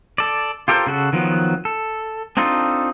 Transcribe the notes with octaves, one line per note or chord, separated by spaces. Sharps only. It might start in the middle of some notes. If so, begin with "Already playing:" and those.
A4 D5
F4 G4 A4 A#4 C5
C#3 F#4 A4
D#3 F3 F#3 B3
A4
C4 D4 D#4 F4 A4